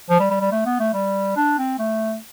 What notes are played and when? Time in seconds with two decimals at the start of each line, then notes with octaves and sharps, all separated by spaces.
0.09 F3
0.20 G3
0.30 G3
0.41 G3
0.52 A3
0.66 B3
0.80 A3
0.93 G3
1.36 D4
1.58 C4
1.78 A3